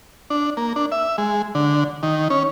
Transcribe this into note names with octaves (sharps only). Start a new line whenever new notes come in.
D4
A#3
D4
E5
G#3
D3
D#3
C#4